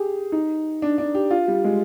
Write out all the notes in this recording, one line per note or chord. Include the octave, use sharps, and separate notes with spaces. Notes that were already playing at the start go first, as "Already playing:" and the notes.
Already playing: G4 G#4
D#4
D4
D4
G4
F4
G3
G#3